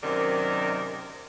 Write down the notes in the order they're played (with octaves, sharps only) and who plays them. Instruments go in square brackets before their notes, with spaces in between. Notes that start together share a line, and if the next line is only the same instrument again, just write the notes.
[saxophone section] F#2 C3 D#3 A#4 D5